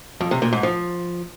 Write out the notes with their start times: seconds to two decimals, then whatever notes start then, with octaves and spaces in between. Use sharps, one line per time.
0.21 F2
0.31 C3
0.42 A#2
0.53 G#2
0.63 F3